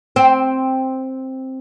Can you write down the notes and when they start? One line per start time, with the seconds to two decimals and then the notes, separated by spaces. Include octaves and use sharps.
0.16 C4